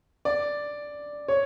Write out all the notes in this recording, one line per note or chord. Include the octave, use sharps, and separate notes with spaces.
D5
C#5